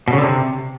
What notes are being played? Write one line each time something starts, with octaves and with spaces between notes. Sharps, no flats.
B2
C#3
D3
C3